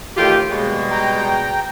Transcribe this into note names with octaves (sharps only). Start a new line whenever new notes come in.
A2 D#3 E3 A3 F4 G4
D#2 B2 G3 G#3
G5 A#5